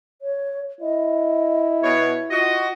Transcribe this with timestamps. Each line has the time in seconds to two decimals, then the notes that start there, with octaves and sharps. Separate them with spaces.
0.22 C#5
0.81 E4 D#5
1.83 B2 C#5
2.31 F4 F#4 D#5